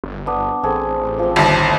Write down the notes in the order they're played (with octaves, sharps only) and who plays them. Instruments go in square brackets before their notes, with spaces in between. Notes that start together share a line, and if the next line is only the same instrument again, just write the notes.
[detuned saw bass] G1
[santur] B3 D4
[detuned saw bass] A1 [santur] C4 G#4 A4
[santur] F3 C4
[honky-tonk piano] G1 D#2 [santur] E5 A5